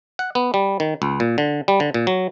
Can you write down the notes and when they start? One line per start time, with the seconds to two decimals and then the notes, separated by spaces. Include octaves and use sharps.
0.19 F#5
0.35 B3
0.54 G3
0.80 D#3
1.02 C#2
1.20 A#2
1.38 D3
1.68 G3
1.80 D3
1.94 A#2
2.07 F#3